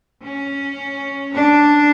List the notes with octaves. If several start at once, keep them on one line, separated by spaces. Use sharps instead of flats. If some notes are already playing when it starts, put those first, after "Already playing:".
C#4
D4